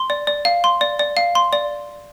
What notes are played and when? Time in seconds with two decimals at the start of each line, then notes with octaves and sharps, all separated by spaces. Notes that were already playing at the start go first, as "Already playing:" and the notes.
Already playing: C6
0.10 D5
0.27 D5
0.45 F5
0.64 C6
0.81 D5
0.99 D5
1.17 F5
1.35 C6
1.53 D5